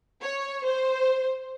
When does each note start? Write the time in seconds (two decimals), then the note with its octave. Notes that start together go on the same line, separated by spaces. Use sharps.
0.21 C#5
0.65 C5